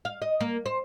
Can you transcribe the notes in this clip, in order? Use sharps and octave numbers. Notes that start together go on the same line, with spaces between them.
F5
D#5
A#3
C5